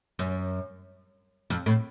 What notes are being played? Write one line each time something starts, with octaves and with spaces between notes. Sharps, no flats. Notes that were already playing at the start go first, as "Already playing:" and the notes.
F#2
F2
A2